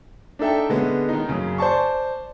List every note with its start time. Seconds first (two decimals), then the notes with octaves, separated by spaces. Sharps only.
0.39 D4 D#4 A4 E5 G5
0.69 D3 G#3 B3 C#4
1.09 D#3 D#4
1.29 F#2 C#3
1.58 C5 D5 A5 C#6